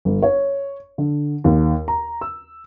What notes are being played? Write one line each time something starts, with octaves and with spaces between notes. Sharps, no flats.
G1
C#5
D3
D#2
A#5
E6